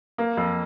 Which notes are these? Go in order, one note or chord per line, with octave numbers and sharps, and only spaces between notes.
A#3
F2